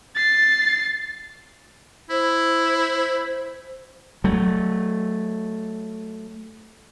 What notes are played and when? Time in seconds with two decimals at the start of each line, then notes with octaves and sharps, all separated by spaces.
0.15 A6 C7
2.10 E4 C5
4.24 F#3 A3